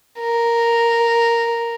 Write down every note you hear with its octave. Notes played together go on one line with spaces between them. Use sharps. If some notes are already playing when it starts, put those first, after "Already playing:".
A#4